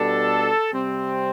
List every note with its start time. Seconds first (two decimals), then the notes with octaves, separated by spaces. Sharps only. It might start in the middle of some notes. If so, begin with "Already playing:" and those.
Already playing: B2 G3 D4 A4
0.70 C3 G3 C4